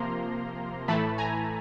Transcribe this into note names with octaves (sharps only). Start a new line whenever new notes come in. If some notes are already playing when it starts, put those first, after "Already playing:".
Already playing: C3 F3 A#3 A#5 C6
A2 E3 A3 A5 B5
G#5 A#5